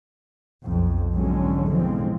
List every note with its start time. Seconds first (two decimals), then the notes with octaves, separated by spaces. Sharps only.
0.63 B1 F2
1.15 E2 G#2 D3 F#3 G#3 C#4
1.71 B2 E3 F3 G#3 C4